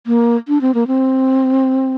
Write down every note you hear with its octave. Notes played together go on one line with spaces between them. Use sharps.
A#3
D4
C4
A#3
C4